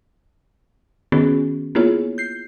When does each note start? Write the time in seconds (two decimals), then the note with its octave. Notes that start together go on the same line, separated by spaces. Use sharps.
1.12 D#3 B3 C#4 F#4 G#4
1.75 A#3 B3 E4 F4 G#4 C#5
2.18 G6 C7